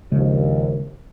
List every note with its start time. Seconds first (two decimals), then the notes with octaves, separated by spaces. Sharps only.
0.12 A#1 D#2 C#3 G#3